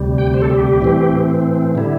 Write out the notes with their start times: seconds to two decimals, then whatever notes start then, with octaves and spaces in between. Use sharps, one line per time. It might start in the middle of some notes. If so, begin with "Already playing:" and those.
Already playing: D2 C3 G3
0.18 G5
0.34 C5
0.42 A4
0.50 G4
0.81 A2 E3 C4
1.75 D3 G3 E4